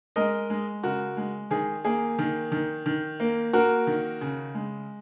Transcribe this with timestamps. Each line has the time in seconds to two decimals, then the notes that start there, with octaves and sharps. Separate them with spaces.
0.16 G#3 A#4 D#5
0.50 G#3
0.83 C#3 F#4 A#4
1.17 G#3
1.51 D#3 G#4
1.85 A#3 G#4
2.19 D#3
2.52 D#3
2.86 D#3
3.20 A#3
3.53 A#3 F#4 A#4
3.87 D#3
4.21 C#3
4.54 G#3